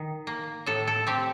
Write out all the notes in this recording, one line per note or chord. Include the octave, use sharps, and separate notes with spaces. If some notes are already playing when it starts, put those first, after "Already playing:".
Already playing: D#3
A#3
A2 A4
A4
C4 G4